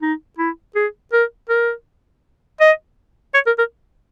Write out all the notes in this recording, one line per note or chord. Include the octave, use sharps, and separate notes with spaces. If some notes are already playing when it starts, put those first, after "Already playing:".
D#4
E4
G#4
A#4
A#4
D#5
C#5
A#4
A#4